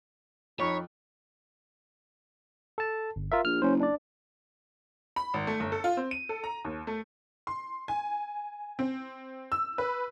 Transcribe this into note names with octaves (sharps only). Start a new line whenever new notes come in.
F2 D#4 C#5 B5 C#6
A4 A5
G1
F4 A#4 E5
A#1 F6
F#1 C#4 C5
D4 D5
B5
G#1
A3
G1
A4
F4
C4
D#7
A4
A#5
D#2
A3
C6
G#5
C4
E6
B4